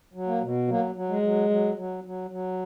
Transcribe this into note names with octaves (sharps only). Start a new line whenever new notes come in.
F#3
A#3
B2
F#3 A#3
F#3
G#3
F#3
F#3
F#3
F#3
F#3